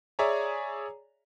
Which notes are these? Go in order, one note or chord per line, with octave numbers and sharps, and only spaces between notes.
G#4 C#5 D5 E5 G#5 A#5